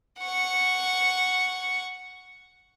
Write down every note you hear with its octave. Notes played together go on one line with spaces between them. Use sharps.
F#5 C#6